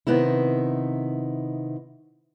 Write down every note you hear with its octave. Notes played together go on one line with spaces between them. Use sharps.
C3 D#3 B3 D#4 E4